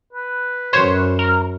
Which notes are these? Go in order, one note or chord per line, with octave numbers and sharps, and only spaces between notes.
B4
F#2 C5 C#5
A#4